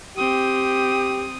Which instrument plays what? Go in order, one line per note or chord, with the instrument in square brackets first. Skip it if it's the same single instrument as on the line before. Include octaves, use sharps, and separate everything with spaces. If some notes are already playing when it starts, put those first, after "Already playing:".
[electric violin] C4 D#6 [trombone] G4